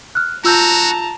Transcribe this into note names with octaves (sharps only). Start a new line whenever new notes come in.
F6 F#6
F4 F#4 A5 A#5 E6 G6